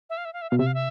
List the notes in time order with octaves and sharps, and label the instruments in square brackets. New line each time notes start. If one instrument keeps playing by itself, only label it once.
[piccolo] E5
F5
E5
F5
E5
[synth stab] B2 [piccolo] F5
[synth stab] C3 [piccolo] E5
[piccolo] F5
E5